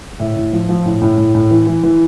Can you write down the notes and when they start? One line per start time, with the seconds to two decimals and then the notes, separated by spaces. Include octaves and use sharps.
0.20 A2 E5
0.36 A2
0.52 F3
0.69 F3
0.86 A2
1.02 A2
1.18 A2
1.35 A2
1.51 E3
1.67 E3
1.83 E3